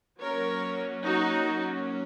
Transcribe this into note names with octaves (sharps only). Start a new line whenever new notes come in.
F#3 A#3 C#4 A#4 C#5
D#4 F#4